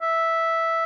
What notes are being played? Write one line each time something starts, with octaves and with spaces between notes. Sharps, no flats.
E5